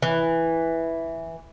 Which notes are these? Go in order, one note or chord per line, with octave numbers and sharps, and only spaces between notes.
E3